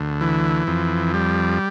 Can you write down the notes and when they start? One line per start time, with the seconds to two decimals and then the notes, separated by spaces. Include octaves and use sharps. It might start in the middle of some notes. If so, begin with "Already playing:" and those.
Already playing: D2
0.21 E3
0.67 F2
1.14 G3